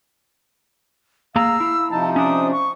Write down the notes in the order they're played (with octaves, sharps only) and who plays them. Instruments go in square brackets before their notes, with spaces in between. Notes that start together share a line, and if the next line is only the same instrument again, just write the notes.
[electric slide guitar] A#3 G#4 A#5 [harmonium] F5 [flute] E6
[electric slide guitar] E4
[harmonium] C3 F3 D#4 [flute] A5
[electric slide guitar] C#4 D4 [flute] D#6
[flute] C#6